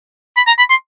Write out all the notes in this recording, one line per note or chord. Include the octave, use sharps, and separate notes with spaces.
B5
A#5
B5
C6